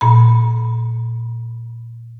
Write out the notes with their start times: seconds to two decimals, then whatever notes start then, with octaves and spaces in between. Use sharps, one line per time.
0.01 A#2 B5